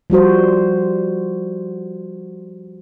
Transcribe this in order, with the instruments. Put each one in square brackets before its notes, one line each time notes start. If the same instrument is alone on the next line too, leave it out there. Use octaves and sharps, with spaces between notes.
[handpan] F3 G3 F#4 C5